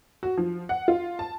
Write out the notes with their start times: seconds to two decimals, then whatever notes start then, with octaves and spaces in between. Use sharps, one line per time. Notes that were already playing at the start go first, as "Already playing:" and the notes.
0.23 F#4
0.37 F3
0.69 F#5
0.88 F4
1.19 A5